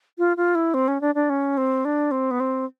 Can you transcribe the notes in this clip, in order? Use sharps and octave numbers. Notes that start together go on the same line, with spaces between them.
F4
F4
E4
C4
C#4
D4
D4
C#4
C4
D4
C4
B3
C4